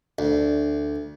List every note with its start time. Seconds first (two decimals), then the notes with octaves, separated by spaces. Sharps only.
0.19 D2